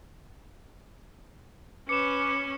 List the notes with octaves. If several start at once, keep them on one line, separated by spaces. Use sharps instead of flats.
C#4 B4 D6 C#7 E7